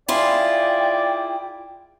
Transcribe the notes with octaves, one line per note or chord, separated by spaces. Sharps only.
E4 F4 G#4 D5 G5